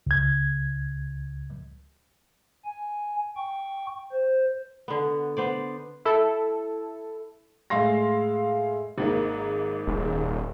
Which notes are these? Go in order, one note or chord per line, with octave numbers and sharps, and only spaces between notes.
C#2 G#6
G#5
G5 C#6
C5
D3 B3
B3 C5 D5
E4 A4
A2 G#3 E5 F5 C6 A#6
G#1 G#2 A#3
D#1